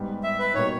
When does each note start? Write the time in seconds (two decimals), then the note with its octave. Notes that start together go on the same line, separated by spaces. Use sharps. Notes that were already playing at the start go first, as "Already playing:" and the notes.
Already playing: G#2 G3 B3
0.23 E5
0.39 B4
0.54 B2 G3 A#3 D#4 C#5